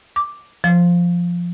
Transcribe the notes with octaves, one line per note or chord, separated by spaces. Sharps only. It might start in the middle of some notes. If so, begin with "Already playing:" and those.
D6
F3